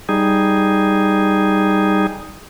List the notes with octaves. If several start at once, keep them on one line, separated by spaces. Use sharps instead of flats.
G3 D#4 G#4